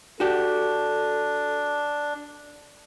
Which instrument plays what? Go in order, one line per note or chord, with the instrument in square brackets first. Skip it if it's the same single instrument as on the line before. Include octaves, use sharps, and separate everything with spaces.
[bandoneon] D4 [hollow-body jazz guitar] F#4 G4 [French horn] A4